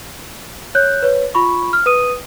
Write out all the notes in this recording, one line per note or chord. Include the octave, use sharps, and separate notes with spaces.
C#5 F#6 G6
B4 C#5
F4 B5 C#6
F6
B4 D#6 D#7